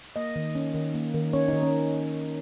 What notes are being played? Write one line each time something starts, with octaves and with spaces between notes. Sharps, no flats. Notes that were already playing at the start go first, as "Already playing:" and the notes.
A#3 D#5
D#3
C#4
D#3
A#3
D#3
C#4 C#5
D#3 D#4
C#4